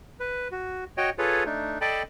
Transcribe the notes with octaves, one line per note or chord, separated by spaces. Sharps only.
B4
F#4
F#4 C#5 D#5 G5
F4 G#4 A4 B4 C#5
A3 D4 D#4
A4 D5 D#5 G5 A5 B5